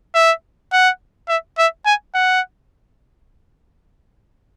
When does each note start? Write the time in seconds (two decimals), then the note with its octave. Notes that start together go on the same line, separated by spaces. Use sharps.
0.15 E5
0.73 F#5
1.29 E5
1.58 E5
1.86 G#5
2.15 F#5